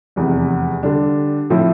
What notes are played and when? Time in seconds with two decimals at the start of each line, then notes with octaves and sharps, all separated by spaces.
0.16 F1 E2 C3
0.83 D3 G3 D4
1.50 A2 F3 C4 E4